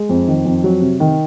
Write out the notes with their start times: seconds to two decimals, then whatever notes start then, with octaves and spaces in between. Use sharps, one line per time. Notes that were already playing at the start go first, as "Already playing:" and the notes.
Already playing: G#3
0.09 F2
0.28 D#3
0.45 F2
0.64 F#3
0.82 C3
1.00 D#3